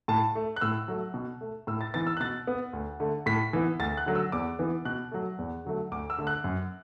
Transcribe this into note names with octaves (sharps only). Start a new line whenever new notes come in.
A2 A5
A3
F#6
A2 E6
F#3 A3
B2
A3
A2 E6
A6
E3 B3 A6
E6
F#6
B2 A6
B3
D2
D3 A3
A2 B6
E3 B3
D2 A6
F#6
D3 F#3 A3
E6
E2 D6
E3 B3
B2 F#6
F#3 A3
E2
D3 F#3 A3
D2 D6
E6
D3 A3
F#6
F#2